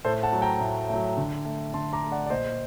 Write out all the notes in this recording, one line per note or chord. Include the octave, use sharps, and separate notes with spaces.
A2 A4 C5
F#5 A5
F#3 A3
G5 A#5
A2
F#3 A3
D3
A3
D3 A5 C6
A#5 D6
A3
D5 F#5
D5
A#2 C5 D#5